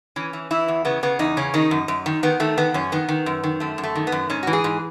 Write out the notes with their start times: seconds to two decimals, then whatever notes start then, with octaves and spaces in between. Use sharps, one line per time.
0.16 E3 C#4
0.33 E3
0.51 E3 E4
0.68 E2
0.85 C#3 B3
1.03 C#3 B3
1.19 E2 D#4
1.37 C#3 C#4
1.54 D#3 D#4
1.71 F#2
1.88 F#2
2.06 D#3
2.23 D#3 B3
2.40 D#3 A3
2.58 D#3 B3
2.74 F#2 C#4
2.92 D#3 B3
3.09 D#3
3.26 F#2
3.43 D#3
3.60 F#2 A3
3.78 F#2
3.83 A3
3.95 D#3
4.07 B3
4.12 F#2
4.30 G#2 C#4
4.43 E3 F#4
4.53 G#4
4.64 G#2